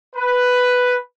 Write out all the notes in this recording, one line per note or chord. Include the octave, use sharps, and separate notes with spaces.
B4